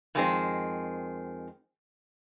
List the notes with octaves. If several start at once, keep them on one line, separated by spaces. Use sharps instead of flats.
F2 D#3 G#3 C4